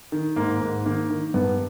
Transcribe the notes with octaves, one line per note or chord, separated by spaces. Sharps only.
D#3
G#2 A#3
G#2
D#3 A#3
D#3
G2 B3